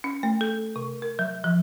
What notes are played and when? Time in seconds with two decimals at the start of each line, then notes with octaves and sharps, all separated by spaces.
0.04 C#4
0.23 A3
0.41 A4
0.76 C3
1.02 A#4
1.19 F#3
1.44 F3